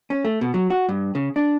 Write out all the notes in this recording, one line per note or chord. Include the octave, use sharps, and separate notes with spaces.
C#4
A3
B2
F#3
F#4
G2
C#3
D4